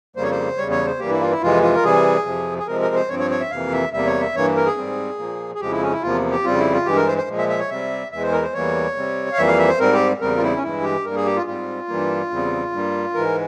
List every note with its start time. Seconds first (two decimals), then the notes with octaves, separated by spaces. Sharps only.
0.16 F2 C#3 G3 A#3 C5
0.23 C#5
0.31 C5
0.57 E2 C#3 G3 C#5
0.71 C#5
0.86 C5
1.00 G2 E3 G3 A#3 G4
1.11 E4
1.21 F4
1.31 E4
1.42 F2 C3 E3 G#3 F4
1.63 F4
1.76 A#4
1.83 C3 E3 G3 G#4
2.26 F2 C3 F3
2.58 G#4
2.67 C3 F3 G#3 C4 A#4
2.81 A#4
2.95 C5
3.09 G2 F3 C4 C#5
3.19 C#5
3.31 C#5
3.40 E5
3.51 F2 C3 E3 A#3 F5
3.73 E5
3.92 E2 C3 G3 A#3 E5
4.07 C#5
4.21 E5
4.35 G2 E3 A#3 C#5
4.56 A#4
4.66 G#4
4.77 G#2 G3 C4
5.19 A#2 F3 A#3
5.55 G#4
5.61 F2 C#3 F3 G#3 G4
5.71 E4
5.82 C#4
5.92 E4
6.02 E2 C3 F3 A#3 F4
6.31 G4
6.44 F2 C#3 G3 C4 F4
6.58 E4
6.73 F4
6.86 G2 E3 G#3 G4
6.97 A#4
7.07 C5
7.18 C5
7.28 A#2 F3 G#3
7.38 E5
7.49 E5
7.59 C#5
7.70 C3 G3 C4 E5
8.12 E2 E3 G#3 E5
8.22 C5
8.32 A#4
8.43 C5
8.53 E2 E3 G3 A#3 C#5
8.96 C3 G3 C4
9.32 F5
9.38 F2 E3 G3 A#3 E5
9.47 F5
9.58 E5
9.68 C5
9.79 G#2 G3 C4 A#4
9.93 G4
10.21 E2 C#3 G3 C4 A#4
10.37 F4
10.42 E4
10.56 C#4
10.63 G2 E3 G#3 E4
10.84 G4
11.05 G2 G3 A#3 A#4
11.16 G#4
11.26 G4
11.36 F4
11.46 G#2 G3 C4 F4
11.88 G2 E3 G3 A#3
12.30 E2 C#3 G3 C4
12.72 G2 G3 A#3
13.14 G#2 E3 G#3 A#4